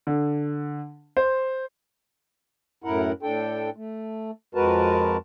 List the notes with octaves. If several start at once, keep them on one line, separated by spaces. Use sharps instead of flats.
D3
C5
F#2 A2 E4 A#4 F#5
A2 D4 A4 G5
A3
F2 G#3 F#4 A#4 B4 A5